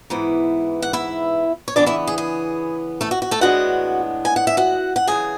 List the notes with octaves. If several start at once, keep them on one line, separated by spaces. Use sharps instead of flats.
G#2 E3 B3 E4
F#5
E4 E5
C#5
C#3 E3 B3 D4 D5
E4 E5
G#4
G#4
A3 A4
F#4
F#4
A3 A4
A2 E3 G#3 B3 D4 F#4 F#5
G#5
F#5
E5
F#4 F#5
F#5
D2 C#3 E3 G#4 G#5